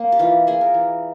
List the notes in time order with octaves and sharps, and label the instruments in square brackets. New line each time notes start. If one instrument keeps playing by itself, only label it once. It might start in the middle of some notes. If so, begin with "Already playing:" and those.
Already playing: [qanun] A#3 C#4
G4
E3 F4
A#3 G#4
A#4
E3